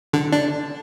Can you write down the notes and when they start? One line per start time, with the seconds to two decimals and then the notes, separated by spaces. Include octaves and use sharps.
0.13 D3
0.32 D4